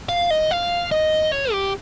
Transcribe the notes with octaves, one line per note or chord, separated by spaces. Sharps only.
F5
D#5
F5
D#5
C#5
G4